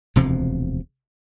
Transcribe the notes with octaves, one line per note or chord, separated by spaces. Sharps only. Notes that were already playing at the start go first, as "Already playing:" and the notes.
E1 D2 C3 F3